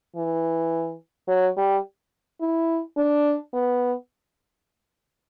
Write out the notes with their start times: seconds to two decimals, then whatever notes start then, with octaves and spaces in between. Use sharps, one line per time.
0.16 E3
1.28 F#3
1.57 G3
2.41 E4
2.97 D4
3.53 B3